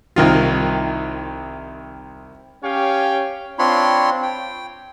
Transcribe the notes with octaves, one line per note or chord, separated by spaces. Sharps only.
C2 D#3 F4
C#4 G4 C#5 F5 G5
C4 D4 F4 C#5 B5 C6
G5